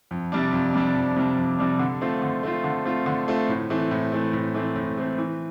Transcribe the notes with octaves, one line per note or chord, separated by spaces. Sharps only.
F2
C3 G3 D4
F2
C3 G3 D4
F2
C3 G3 D4
F2
C3 G3 D4
D3
A3 C4 F4
D3
A3 C4 F4
D3
A3 C4 F4
D3
A3 C4 F4
A2
E3 A3 C4
A2
E3 A3 C4
A2
E3 A3 C4
A2
E3 A3 C4
E3